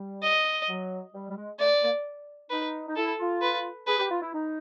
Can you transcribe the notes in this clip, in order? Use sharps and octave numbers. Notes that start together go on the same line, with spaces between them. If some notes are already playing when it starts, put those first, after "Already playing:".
Already playing: G3
D#5
F#3
G3
G3
G#3
A3 D5
A#3
D#4 B4
D#4
E4 A4
F4
B4
G#4 B4
G4
F4
E4
D#4